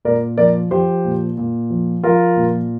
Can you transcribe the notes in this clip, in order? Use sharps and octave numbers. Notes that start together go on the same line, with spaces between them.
A#2 A#4 D5
F3 A#4 D5
F3 G4 C5
A#2
A#2
F3
F3 F4 A#4
A#2